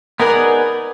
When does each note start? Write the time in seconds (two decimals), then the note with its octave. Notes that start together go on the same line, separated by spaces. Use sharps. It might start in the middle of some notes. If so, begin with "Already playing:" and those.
0.20 B3 D#4 G#4 A#4 B4 D5